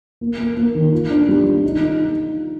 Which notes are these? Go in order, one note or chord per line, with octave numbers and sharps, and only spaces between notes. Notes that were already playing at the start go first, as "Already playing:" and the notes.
A#3
A#3
A#3
D#3
F4
D4
G3
F4
D#4
D#4